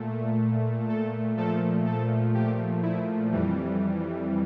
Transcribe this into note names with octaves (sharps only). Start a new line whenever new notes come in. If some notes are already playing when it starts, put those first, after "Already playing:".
Already playing: A#2 A3
A4
A#2 F3 A3 A4
A4
G4
E4
F2 E3 G3